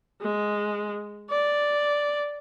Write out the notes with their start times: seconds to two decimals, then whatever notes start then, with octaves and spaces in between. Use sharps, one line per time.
0.21 G#3
1.30 D5